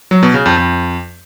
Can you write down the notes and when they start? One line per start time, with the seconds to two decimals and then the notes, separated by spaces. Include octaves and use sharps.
0.11 F#3
0.23 B2
0.34 C#3
0.46 F2
0.57 F2